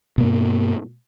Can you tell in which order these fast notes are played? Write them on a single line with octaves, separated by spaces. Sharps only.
B2 A#3 G2